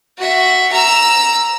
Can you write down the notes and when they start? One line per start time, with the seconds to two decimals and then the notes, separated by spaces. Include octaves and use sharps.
0.17 F#4 E5
0.72 A#5 E6